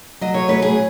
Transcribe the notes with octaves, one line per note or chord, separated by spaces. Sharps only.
F#3 D#5
C#5
A2 B4
G#4